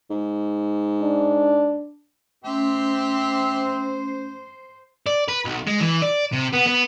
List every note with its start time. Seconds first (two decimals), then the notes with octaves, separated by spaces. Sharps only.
0.10 G#2
1.02 D4
2.44 A3 C4 C#4 G4 C5 E5
5.07 D5
5.28 B4
5.45 B1
5.67 G#3
5.80 E3
6.02 D5
6.33 C3
6.54 B3
6.67 B3